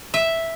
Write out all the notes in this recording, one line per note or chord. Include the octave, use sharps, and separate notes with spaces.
E5